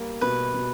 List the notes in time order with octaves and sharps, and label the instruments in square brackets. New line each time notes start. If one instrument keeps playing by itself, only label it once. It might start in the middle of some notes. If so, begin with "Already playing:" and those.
Already playing: [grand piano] G3 A#3
[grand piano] B2 [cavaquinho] B4
[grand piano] B2